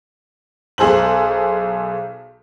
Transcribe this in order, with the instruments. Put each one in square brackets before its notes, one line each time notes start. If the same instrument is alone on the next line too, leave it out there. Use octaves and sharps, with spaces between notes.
[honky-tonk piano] B1 G#4 A4 C5 F#7